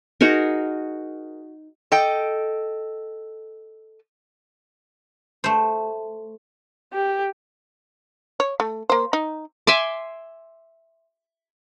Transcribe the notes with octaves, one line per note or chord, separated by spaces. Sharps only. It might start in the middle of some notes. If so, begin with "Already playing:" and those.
D#4 F#4 G#4 A#4
A4 D#5 G5
A3 C5
G4
C#5
A3
A#3 C5
D#4
E5 G#5 C6 D6